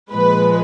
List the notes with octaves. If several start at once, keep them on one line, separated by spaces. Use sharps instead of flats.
A#2 F3 G#3 B4